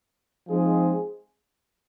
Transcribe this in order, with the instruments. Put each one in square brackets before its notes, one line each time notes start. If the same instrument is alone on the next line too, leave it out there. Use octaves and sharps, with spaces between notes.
[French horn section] F3 G#3 C4 D#4 G#4